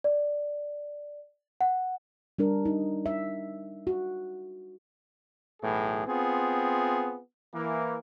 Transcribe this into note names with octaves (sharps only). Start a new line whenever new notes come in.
D5
F#5
G3 D4 A#4
D#4
E5
F#4
B1 A2 E3 G#4
B3 C4 F4 G#4
E3 A#3